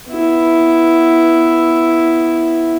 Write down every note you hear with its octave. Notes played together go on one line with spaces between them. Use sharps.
B3 E4